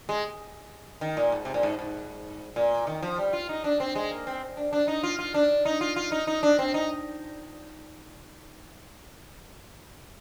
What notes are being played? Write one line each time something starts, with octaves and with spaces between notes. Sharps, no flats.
G#3
D#3
A#2
G#2
C3
A#2
G#2
G#2
A#2
D#3
F3
G3
F4
D#4
D4
C4
G#3
A#3
C4
D4
D4
D#4
F4
F4
D4
D#4
F4
F4
D#4
D#4
D4
C4
D#4